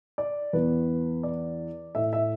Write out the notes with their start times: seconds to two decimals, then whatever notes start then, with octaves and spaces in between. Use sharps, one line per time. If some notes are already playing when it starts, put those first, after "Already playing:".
0.18 D5
0.53 E2 E3 B3 B4
1.23 D5
1.95 A2 A3 E5
2.13 E5